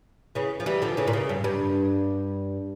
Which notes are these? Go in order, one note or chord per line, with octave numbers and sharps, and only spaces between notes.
C#3 E3
F3
E3 G3
D3 F3
C#3 E3
A#2
C#3
G2
G2